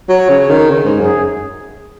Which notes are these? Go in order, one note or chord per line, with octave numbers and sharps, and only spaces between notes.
F#3 C#5
C#3
D#3
C#3
G#2
F#2 G#4